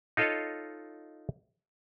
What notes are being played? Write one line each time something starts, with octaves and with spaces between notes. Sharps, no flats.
D#4 F4 A4 C#5 D#5 F5